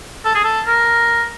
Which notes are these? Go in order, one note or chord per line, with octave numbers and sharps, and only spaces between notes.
A4
G#4
A4
A#4